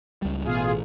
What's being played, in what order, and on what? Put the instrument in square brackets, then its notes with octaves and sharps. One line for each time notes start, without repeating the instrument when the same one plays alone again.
[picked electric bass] C#2 G3
[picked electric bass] A1 [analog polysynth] B2 F4 G#4